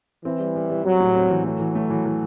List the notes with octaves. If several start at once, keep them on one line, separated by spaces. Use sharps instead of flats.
E3 C4
G3
G3
G3
F#3 C4
A2
C4
E3
F#3 A3
E3
A3
E3
E3